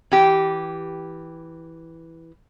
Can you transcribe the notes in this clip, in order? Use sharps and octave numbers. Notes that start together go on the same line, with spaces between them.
E3 G4